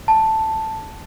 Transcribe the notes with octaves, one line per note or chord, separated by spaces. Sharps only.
A5